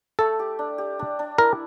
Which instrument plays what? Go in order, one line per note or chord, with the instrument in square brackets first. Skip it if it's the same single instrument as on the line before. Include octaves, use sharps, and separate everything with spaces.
[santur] A3 [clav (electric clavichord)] A4
[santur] G4
D4
G4
D4
D4
[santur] E4 [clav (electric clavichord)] A#4